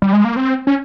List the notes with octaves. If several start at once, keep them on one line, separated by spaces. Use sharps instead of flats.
G3
G#3
A#3
C4
C#4